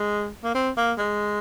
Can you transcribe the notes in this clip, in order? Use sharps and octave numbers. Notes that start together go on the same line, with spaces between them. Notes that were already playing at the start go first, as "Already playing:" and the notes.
Already playing: G#3
A#3
C4
A#3
G#3